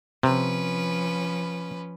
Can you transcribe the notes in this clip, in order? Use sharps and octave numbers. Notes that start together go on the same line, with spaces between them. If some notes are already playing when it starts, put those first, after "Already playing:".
C3 F3 C#4 B4